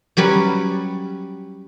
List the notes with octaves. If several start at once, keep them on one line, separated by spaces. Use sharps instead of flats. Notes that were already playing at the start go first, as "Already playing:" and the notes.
F#3 G3 C#4 B4